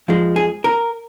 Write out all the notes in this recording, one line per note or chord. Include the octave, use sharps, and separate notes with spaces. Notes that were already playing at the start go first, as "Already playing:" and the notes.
F2 F3 G#3
G#4
A#4